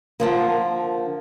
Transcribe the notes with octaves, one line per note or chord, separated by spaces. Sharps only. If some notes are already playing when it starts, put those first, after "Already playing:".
D3 F3 A#3